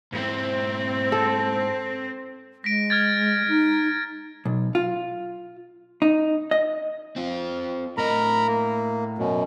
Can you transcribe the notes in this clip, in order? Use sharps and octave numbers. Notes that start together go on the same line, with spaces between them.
G#2 G#3 C4 E4
A4
G#3 A#6 B6 D7
F6 G#6 A6
D#4
B1
F4
D#4
D#5
C4 F4
A2 A#4 D#5 A#5 B5
A#3
F#2 B2